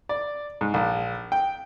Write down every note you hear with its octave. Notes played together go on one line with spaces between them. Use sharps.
D5
G#2
A#1
G5